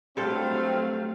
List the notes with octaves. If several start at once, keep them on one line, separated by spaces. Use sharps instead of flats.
G2 F#3 A3 C4 A4 C5 F5